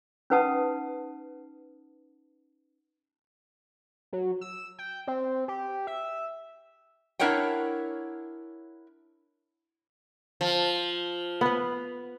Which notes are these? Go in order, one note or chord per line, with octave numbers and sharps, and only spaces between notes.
C#4 D#4 B4 F#5 A5 D#6
F#3
E6
G5
C4
G4
E5
D4 E4 A#4 C#5 F#5 G5
F3
B3 B4